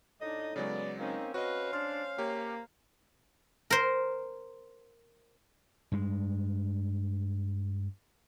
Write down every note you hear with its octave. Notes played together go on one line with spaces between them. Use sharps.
A2 D4 D#4 D#5
C#3 F#3 G#3 B3 D5
A#3 C4 C#4 D#4
C#4 F#4 B4 C5 D#5 F5
D4 C6 F6
A#3 G4 C#5
A#4 C5
G2 G#3